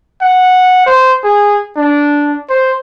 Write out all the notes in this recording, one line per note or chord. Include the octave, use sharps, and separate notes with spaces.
F#5
C5
G#4
D4
C5